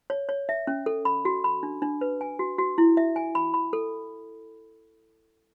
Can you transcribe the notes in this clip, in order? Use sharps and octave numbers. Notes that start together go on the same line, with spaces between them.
C#5
C#5
E5
C#4
A4
B5
F#4
B5
D4
D4
B4
G#5
F#4
F#4
E4
E5
G#5
B5
B5
A4